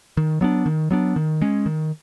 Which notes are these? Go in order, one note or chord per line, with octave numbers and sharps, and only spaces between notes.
D#3
F#3 B3 D4
D#3
F#3 B3 D4
D#3
G#3 C#4
D#3